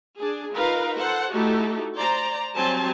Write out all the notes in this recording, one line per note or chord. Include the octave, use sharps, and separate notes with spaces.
D4 G#4
D#4 F4 A#4 B4 F5
A4 C5 F#5
A3 D#4 E4 F#4 G4 A4
C5 D5 A#5
F#3 G3 C4 G4 G#5 A5